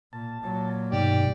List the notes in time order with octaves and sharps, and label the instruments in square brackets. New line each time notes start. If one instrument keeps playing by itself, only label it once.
[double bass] A#2 [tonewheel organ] A5
[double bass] A#2 F#3
[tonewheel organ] G2 B2 D#3 [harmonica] G4 D5